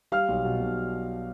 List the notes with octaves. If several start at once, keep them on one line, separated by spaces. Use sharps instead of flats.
G3 F5 F6
B1
B2
B1